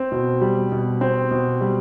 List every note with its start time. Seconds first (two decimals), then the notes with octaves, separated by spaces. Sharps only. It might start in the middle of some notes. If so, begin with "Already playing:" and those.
Already playing: C4
0.12 B2
0.41 G3
0.72 B2
1.01 C4
1.31 B2
1.61 G3